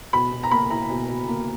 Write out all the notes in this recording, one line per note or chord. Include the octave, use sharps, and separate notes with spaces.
B2 B5
B2
A#5
A#3 B5
E4 A#5
B2
B2
A#3